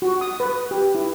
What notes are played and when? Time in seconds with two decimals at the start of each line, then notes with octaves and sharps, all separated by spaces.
0.02 F#4
0.21 D#6
0.40 B4
0.71 G4
0.95 E4